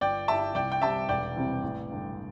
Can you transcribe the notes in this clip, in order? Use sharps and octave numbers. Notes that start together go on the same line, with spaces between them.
G1 D5 G5
G2 G3 E4 E5 A5
C2 D5 G5
G5
C3 G3 C4 E5 A5
E1 D5 G5
E2 C3 G3 C4
A1
G2 D3